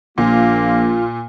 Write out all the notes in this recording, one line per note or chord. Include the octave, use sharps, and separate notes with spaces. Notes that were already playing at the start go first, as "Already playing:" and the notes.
A#1 A#2 A#3 F4